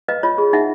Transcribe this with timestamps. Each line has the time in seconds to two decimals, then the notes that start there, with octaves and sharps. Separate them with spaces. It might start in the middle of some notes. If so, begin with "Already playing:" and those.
0.08 B4 D#5 F5
0.23 F4 C#5 D#5
0.38 G#4
0.53 D#4 E5 F#5